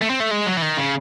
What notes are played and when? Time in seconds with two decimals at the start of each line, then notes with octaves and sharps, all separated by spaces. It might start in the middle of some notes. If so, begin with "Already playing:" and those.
0.02 A3
0.10 C4
0.20 A3
0.31 G#3
0.46 F#3
0.57 E3
0.62 D#3
0.78 C#3